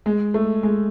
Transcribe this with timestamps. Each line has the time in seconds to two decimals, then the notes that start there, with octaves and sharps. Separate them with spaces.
0.06 G#3
0.34 A3
0.63 G#3